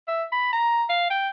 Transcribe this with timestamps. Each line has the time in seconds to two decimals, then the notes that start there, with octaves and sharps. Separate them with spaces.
0.08 E5
0.32 B5
0.53 A#5
0.90 F5
1.10 G5